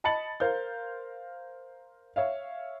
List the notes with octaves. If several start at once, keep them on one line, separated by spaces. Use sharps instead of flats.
D#5 A5 B5 A6 C#7 F#7
A#4 C5 F5 G6
C#5 E5 F5